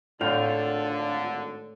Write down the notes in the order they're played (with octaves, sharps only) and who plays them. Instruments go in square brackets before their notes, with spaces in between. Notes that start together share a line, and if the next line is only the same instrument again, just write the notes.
[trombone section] G#1 D3 [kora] A2 [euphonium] D4 [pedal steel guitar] F4 F5 G5